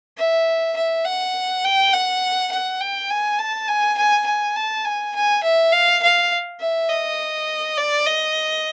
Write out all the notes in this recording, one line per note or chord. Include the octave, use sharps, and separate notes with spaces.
E5
E5
F#5
G5
F#5
F#5
G5
G#5
A5
G#5
G#5
G#5
A5
G#5
G#5
E5
F5
F5
E5
D#5
D5
D#5